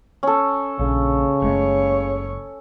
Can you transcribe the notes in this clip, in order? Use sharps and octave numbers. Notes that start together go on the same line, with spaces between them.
C#4 A4
A#1 C#3
F#1 G#3 A3 C#5